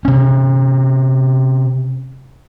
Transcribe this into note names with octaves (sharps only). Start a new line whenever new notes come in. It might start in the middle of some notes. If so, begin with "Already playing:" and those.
C3 C#4